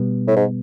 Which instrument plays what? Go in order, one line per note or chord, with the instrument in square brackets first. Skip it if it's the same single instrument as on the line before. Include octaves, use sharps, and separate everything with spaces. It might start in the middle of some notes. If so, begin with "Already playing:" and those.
Already playing: [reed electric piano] B2 G3 B3
[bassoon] A2
G#2